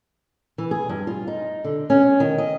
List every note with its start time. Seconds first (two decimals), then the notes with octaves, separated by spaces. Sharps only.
0.58 E3
0.71 G#4
0.89 G2
1.07 F4
1.28 D#4
1.64 D3
1.90 C#4
2.20 D#3
2.38 D#5